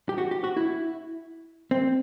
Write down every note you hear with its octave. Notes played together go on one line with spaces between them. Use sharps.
G4
F#4
G4
F#4
E4
C4